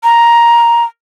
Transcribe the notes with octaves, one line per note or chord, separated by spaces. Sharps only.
A#5